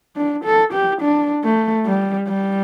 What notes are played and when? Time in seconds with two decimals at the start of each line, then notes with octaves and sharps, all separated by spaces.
0.16 D4
0.44 A4
0.73 G4
1.01 D4
1.44 A3
1.85 G3
2.28 G3